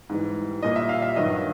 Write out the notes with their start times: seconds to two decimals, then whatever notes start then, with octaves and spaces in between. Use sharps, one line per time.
0.09 G#2 E3 G3
0.62 A#2 G3 D#5
0.76 E5
0.89 F5
1.02 E5
1.16 G2 D#3 F#3 D#5